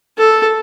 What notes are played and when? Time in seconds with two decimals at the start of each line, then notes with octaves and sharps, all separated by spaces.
0.18 A4